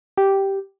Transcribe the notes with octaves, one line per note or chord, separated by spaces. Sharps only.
G4